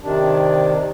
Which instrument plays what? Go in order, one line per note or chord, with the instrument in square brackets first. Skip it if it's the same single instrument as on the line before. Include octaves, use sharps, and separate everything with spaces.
[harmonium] C3 D#3 D4